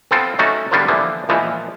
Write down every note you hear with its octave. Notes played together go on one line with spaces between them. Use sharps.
B3 C4 F4 A4
A3 C#4 D#4 F#4 A4
D3 G3 B3 F4 A#4 C5
D3 E3 F3 A#3 B3
A#2 E3 F3 G#3 B3